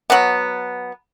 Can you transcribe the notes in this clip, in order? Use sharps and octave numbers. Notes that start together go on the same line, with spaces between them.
F#3 B3